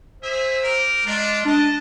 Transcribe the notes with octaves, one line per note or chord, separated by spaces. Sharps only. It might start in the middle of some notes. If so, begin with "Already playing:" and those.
G#4 C5 E5
G4 A#4
G#3 A3 D4 F4
D4 D#5 A5